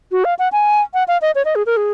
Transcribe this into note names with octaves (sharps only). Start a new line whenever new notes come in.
F#4
F5
F#5
G#5
F#5
F5
D#5
C#5
D#5
G#4
A#4
G#4